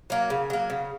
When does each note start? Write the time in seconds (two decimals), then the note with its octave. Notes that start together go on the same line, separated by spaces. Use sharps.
0.10 F#3 A#3
0.30 C#3
0.50 F#3 A#3
0.70 C#3